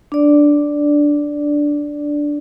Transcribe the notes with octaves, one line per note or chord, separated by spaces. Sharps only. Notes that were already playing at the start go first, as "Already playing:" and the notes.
D4 D5